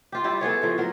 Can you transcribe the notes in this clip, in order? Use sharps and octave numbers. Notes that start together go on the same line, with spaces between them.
F4 G4
G3 E4 G4
A3 B3 G#4 C#5
A2 F3
F#3 A#4